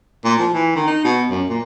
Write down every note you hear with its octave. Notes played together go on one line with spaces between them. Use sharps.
A#2
F3
E3
D#3
D#4
B2
F#2
A#2